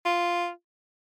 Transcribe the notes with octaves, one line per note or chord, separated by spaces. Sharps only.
F4